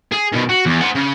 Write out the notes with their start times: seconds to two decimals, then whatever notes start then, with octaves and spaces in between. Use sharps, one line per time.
0.12 G#4
0.33 B2 D#3
0.49 F#4
0.66 E2
0.81 C5 F#5
0.95 C#3